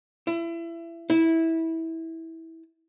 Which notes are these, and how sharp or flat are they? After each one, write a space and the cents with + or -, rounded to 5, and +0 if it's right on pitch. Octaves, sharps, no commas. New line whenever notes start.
E4 +25
E4 -20